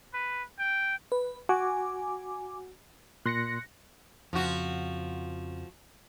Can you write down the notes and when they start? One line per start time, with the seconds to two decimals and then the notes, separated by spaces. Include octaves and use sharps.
0.14 B4
0.59 G5
1.12 B4
1.49 F#4 G#5 D6
3.26 A#2 C6 F#6 A#6 C#7
4.33 F2 C#3 F3 F#4